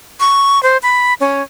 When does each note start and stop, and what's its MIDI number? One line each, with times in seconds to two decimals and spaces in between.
0.20 0.62 85
0.63 0.77 72
0.83 1.14 83
1.20 1.42 61